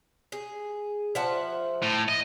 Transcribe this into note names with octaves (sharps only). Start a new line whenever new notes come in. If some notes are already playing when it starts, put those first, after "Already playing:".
G#4
F3 E5 F#5 A5
A2
D#5